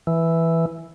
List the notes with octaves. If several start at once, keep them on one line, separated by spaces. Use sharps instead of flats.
E3